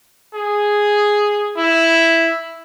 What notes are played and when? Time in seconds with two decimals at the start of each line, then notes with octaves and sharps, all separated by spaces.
0.34 G#4
1.57 E4